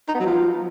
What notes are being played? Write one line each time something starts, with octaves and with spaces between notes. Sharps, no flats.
D#4
B3
F#3
F3